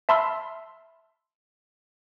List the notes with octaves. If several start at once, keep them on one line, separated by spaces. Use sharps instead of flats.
E5 A5 B5 C6 E6 F6